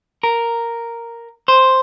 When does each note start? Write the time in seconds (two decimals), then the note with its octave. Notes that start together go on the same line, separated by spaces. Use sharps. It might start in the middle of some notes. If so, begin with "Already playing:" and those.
0.23 A#4
1.48 C5